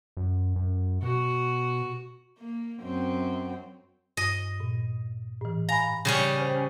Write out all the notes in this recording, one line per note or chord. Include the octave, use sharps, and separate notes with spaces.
F#2
F#2
B2 F#4
A#3
F#2 C4
G2 D#5
A#2
A2 E3
F5 G#5 A#5 B5
C#3 G3 C#4
C5 G5